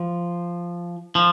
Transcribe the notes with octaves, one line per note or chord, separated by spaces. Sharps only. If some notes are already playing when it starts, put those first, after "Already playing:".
Already playing: F3
F3